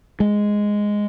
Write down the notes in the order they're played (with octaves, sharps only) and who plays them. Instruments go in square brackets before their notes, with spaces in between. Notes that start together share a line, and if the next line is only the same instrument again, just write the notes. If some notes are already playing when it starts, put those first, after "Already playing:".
[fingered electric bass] G#3